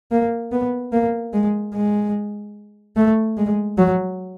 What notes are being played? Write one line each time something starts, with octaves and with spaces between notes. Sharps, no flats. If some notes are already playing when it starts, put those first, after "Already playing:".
A#3
B3
A#3
G#3
G#3
A3
G#3
F#3